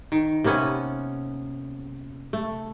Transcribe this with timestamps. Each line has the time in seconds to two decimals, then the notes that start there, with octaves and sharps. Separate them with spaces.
0.12 D#3
0.44 C3 A#3 B3 C#4
2.33 A3